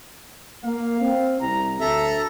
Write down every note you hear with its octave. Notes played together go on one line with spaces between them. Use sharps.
A#3 F5
C4
C2 A#5
D2 A4 E5 A#5